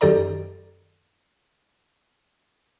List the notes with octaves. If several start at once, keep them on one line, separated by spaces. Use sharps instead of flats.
F#2 D#3 G4 A4 D5 A#5